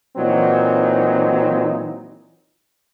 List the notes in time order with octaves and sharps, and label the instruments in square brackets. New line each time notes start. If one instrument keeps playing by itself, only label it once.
[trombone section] A#2 E3 F#3 C4 D#4